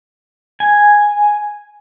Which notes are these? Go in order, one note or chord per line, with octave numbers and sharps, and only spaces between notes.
G#5